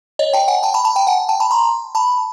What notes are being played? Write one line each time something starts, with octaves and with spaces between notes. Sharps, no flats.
C#5 D#5
G5 A5
F#5 G#5
G5 A5
A5 B5
A5 B5
G5 A5
F#5 G#5
G5 A5
A5 B5
A#5 C6
A5 B5